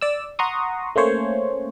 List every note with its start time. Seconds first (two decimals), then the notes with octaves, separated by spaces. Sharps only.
0.01 D5 E6
0.39 F#5 A#5 C6 C#6 D#6
0.96 A3 A#3 C#4 C5 C#5